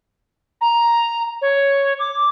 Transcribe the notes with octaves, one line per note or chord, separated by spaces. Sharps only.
A#5
C#5
D6